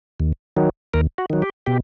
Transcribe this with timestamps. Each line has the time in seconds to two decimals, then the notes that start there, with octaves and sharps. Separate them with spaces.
0.20 D#2
0.57 D#3 F#3
0.94 D#2 A#4
1.18 F#4
1.30 D#3 F#3
1.42 G4
1.66 B2 G4